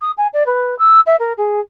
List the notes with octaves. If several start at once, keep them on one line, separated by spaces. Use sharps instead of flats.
D#6
G#5
D5
B4
E6
E5
A#4
G#4